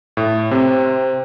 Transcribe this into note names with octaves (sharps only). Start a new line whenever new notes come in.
A2
C3 C4